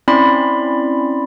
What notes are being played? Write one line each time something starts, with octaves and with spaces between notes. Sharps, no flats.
C4 C#4 E4 D5 B5 C6